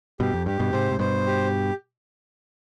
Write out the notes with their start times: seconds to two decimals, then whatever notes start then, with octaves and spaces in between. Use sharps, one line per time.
0.20 G2 B2 G4
0.34 F2
0.46 G2 G4
0.59 G2 B2
0.73 G#2 C3 C5
0.92 G#2
0.99 G2 B2 C5
1.26 G4